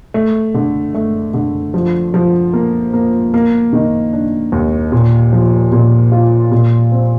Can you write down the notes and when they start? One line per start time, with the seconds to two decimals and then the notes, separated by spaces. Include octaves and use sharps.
0.14 A3
0.54 D3
0.95 A3
1.34 D3
1.74 F3
2.14 F3
2.53 A#3
2.93 A#3
3.34 A#3
3.73 D#3
4.13 D4
4.52 D#2
4.92 A#2
5.33 F3
5.72 A#2
6.12 F4
6.51 A#2
6.92 C4